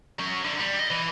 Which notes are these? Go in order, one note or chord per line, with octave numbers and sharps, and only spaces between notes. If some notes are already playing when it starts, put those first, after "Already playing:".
F#3 C#4
D3
G3
D#5
E3